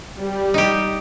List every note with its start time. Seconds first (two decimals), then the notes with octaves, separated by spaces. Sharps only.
0.19 G3
0.54 D#4 G4